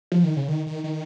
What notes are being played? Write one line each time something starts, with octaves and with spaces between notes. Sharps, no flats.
F3
D#3
C#3
D#3
D#3
D#3